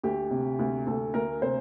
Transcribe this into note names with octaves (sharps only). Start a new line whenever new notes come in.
D2 G4
C3
D2
D2 A4
D2 A#4
C3 C5